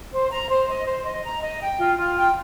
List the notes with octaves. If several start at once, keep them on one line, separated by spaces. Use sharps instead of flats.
C5
A#5
C5
D#5
C5
D#5
A#5
D#5
G5
F4
F4
G5